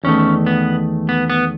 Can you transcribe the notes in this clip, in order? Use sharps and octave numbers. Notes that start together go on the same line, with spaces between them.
E2 D#3 A3 C#4
B3
B3
B3